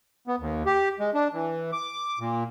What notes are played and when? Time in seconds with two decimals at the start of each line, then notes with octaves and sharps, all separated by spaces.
0.27 B3
0.40 D#2
0.66 G4
1.00 G#3
1.14 D4
1.33 E3
1.72 D6
2.19 A#2